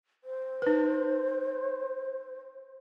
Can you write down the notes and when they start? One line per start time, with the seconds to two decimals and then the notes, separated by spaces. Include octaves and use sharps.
0.24 C5
0.62 D#4 B4